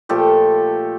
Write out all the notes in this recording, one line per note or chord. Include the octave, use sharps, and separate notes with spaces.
A#2 F3 A3 G4 A4